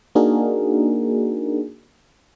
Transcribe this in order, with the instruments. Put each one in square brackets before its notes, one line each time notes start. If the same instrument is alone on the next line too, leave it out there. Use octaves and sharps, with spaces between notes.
[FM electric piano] A#3 D4 D#4 F#4 G#4 A#4